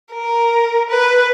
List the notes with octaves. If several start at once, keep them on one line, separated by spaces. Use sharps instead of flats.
A#4
B4